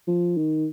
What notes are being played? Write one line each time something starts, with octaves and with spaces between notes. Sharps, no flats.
F3
D#3